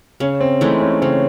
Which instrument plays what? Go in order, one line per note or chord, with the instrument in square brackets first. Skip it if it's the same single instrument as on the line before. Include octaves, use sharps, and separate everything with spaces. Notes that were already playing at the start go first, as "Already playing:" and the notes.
[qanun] C#3 [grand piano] C#4
[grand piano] C4
[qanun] E3 G#3 D#4 [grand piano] A3
[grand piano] C#4
[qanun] C#3 [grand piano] C4